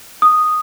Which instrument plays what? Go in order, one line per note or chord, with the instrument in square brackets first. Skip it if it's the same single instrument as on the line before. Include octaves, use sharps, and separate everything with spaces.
[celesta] D#6